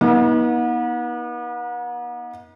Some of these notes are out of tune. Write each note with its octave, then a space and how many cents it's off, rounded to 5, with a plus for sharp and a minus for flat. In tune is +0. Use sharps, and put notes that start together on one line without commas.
B3 -40 D#4 +35 B4 -40